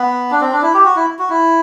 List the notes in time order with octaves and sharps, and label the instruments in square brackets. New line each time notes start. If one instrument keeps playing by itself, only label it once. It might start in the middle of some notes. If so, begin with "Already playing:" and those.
Already playing: [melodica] B3
D4
C4
D4
E4
G4
F#4
E4
F#4
E4